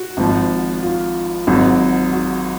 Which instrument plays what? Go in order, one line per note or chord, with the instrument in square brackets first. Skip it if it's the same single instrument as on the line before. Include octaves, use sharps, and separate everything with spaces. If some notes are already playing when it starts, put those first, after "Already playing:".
Already playing: [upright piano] F#4
[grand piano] G#1 G#2 F3
[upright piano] F4
[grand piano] G#1 G#2 F#3
[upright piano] F#4